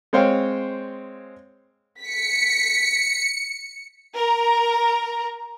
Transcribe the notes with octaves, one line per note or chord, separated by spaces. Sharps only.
G#3 C4 C5 C#5 F5 G5
B6 C#7
A#4 A#5